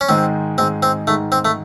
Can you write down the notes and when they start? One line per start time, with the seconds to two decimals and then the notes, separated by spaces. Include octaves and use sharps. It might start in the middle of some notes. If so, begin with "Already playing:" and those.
0.01 C#4
0.08 G#2 D#3 G#3 C4 D#4 G#4
0.58 G#2 D#3 G#3 C4 D#4 G#4
0.83 C4
1.07 G#2 D#3 G#3 A3 D#4 G#4
1.32 C4
1.45 A3